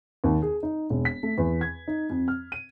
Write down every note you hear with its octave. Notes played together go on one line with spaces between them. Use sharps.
D#2
G#4
D#4
E1
B6
A3
E2
G#6
D#4
F2
F6
D#7